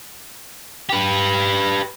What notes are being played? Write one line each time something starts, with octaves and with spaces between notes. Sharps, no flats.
G4 B4